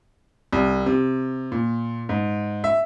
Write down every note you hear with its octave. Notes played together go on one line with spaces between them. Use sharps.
C2
C3
A#2
G#2
E5